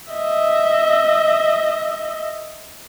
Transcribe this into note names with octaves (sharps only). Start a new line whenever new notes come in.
D#5 E5